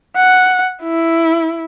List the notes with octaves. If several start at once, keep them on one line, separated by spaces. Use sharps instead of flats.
F#5
E4